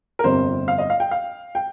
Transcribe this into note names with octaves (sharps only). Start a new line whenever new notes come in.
A#4
G1 F2 C3 C5
F5
D#5
F5
G5
F5
G5